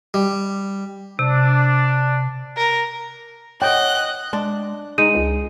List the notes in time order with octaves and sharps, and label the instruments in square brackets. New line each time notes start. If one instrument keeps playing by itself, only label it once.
[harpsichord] G3
[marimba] C3 [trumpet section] D4
[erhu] A#4
[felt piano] C#5 F#5 [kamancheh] D#5 [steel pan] G5 [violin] F#6
[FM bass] G#3 [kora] D4
[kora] G#3 [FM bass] D#4 [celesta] D#7
[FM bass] C#2